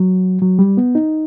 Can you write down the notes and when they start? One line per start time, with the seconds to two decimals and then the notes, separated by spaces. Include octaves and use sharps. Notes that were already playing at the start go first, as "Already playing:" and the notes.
Already playing: F#3
0.42 F#3
0.59 G3
0.77 B3
0.95 D#4